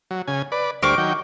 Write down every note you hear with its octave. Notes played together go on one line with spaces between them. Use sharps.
F#3
C#3 G#5
B4 D5
D2 G3 A#4 C5 C#6 D6
D#3 F#3 G5